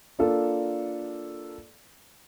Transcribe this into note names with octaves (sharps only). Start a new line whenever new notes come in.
A#3 D4 F4 A4